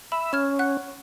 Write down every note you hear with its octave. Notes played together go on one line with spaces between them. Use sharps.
E5 B5
C#4 F6 G#6 E7
F#5 F#6